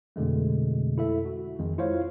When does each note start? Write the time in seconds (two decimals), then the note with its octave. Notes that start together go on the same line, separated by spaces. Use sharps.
0.16 F2 B2 D3 G#3 A3
0.98 E4 A4 E5
1.25 F#4
1.58 F2 D#3 G#3
1.78 E4 F4 C5 C#5 F5